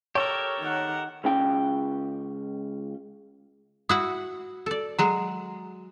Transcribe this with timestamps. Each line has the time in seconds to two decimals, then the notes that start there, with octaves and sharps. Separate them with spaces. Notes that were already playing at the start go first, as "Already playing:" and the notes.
0.15 G4 A4 A#4 C#5
0.60 D#3 F#5
1.24 C#2 C#4 G5
3.89 E4 F#4 F#5 D#6
4.66 A4 D5
4.99 F#3 G#3 F#4 A#5